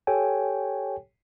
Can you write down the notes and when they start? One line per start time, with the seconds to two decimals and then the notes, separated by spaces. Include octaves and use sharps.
0.07 G4 A4 C#5 G5 G#5